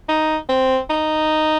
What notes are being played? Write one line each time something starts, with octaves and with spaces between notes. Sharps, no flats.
D#4
C4
D#4